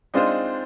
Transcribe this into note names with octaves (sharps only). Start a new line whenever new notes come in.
G#3 C4 D4 D#4 F4 C5